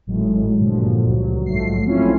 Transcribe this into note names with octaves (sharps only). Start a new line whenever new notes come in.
G#1 A2 F#3 G#3
G2 A#2 D3 F3 F#3
C#2 G2 F#3
A#1 G#2 F3 F#3 A3 C7
F3 A3 C4 C#4 E4 F4